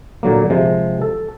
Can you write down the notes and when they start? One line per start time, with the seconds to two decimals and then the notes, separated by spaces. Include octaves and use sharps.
0.23 A#2 D3 F#3 A#3
0.50 C3 F3 G#3
1.02 A4